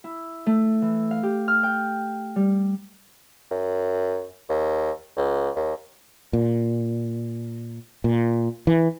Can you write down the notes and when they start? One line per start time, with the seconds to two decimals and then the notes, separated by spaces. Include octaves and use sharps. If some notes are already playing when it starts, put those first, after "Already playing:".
0.04 E4
0.46 A3
0.82 E3
1.11 F5
1.23 G4
1.48 F6
1.63 G5
2.36 G3
3.51 F#2
4.49 D#2
5.17 C#2
5.55 D#2
6.33 A#2
8.04 A#2
8.67 E3